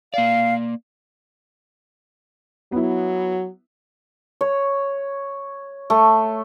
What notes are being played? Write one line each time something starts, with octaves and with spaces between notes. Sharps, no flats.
A#3 D5 F5
F#3 B3 E4
C#5
A3